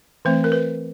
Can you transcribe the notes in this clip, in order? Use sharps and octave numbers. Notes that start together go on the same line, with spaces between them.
E3 A3 C4 C5
A#4
B4